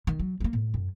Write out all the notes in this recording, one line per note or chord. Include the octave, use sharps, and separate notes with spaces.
D#3
F#3
A3 A#3
A2
F#2